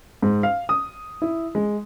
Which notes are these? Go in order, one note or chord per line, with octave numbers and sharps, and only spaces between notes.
G#2
F5
D#6
E4
G#3